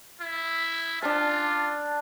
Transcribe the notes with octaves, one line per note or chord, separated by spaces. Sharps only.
E4
D4 F4 A5